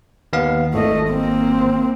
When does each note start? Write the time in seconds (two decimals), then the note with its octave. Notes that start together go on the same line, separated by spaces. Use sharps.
0.33 D#2 B3 F5
0.74 G#1 A3 D#5
1.10 A#3 C4